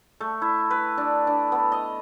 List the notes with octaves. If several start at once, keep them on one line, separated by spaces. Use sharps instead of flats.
A3
E4
B4
D4
D4
B3
D#5